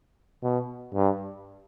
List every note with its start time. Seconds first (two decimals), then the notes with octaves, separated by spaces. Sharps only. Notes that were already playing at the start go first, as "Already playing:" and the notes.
0.43 B2
0.94 G2